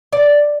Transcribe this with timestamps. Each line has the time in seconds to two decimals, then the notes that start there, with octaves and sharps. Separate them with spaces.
0.13 D5